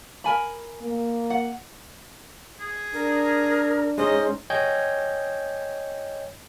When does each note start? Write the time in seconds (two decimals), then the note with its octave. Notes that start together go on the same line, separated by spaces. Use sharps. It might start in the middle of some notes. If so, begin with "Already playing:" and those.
0.24 A#4 G#5 B5
0.82 A#3
1.30 F#5
2.59 G#4
2.94 D4 A#4
3.98 G#3 C#4 D#4 C5 D#5
4.50 C#5 D#5 G5 G#5 G6 G#6